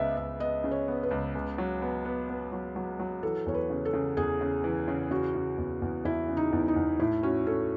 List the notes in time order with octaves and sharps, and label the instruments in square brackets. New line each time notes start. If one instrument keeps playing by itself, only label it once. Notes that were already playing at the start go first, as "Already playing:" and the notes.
Already playing: [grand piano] C#2 C#3 B3 [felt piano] D#5 E5
[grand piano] C#2 [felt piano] E5
[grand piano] B3 [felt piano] D#5
[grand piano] C#3
[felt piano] C#5
[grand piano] B3
[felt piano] B4
[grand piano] C#2
C#2
F#3
B3
B3
B3
F#3
F#3
F#3
[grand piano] E3 [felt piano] A4
[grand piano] E2 [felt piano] C#5
[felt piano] B4
[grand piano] C#3
[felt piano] A4
[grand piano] C#3
[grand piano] E2 [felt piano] G#4
[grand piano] C#3
E3
C#3
[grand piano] C#3 [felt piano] F#4
[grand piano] C#3
E2
E2
[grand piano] E2 [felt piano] E4
[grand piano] C#3
[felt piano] D#4
[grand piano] E2
[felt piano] D#4
[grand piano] E2
[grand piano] A2 [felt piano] E4
[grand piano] C#4 [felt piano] F#4
[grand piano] C#4 [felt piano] A4